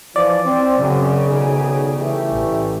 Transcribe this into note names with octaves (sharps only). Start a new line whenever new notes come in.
E3 F3 D5
C4
F#2 C#3
B1 D#3 G#4
E3 A3 G4
A1